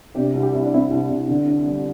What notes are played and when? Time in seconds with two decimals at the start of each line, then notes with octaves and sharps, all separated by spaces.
0.15 C3 D4 G4
0.34 C2
0.43 G4
0.53 C2 E4
0.64 D4
0.72 C3 C4 E4
0.91 C2
1.09 C2
1.28 D3
1.47 D4
1.66 G3